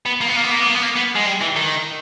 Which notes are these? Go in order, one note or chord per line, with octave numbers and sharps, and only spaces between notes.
B3
A#3
B3
A#3
B3
A#3
B3
A#3
B3
A#3
B3
G#3
G3
E3
D#3